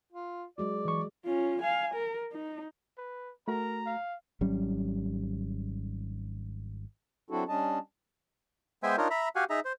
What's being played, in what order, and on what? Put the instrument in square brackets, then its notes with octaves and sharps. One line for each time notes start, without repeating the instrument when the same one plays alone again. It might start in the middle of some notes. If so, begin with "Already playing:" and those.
[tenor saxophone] F4
[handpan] F#3 G#3 F#4 [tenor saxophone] D5
[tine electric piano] E3 C#6
[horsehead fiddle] C#4 F4
F5 G#5
A#4
D#4
[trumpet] B4
[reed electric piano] A3 F#4 [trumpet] A#4 [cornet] A#5
[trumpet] F5
[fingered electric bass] G#1 F#3 G3 C#4
[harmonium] F#3 C4 D4 E4 F#4 A4
G3 C#4 D4 D#5 A5
[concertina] G#3 B3 C5 E5 G5 G#5
D4 D#4 F4 A#4 C#5
E5 A#5 B5
F#4 G4 F5 F#5 G#5
D#4 G#4 E5 A#5
C5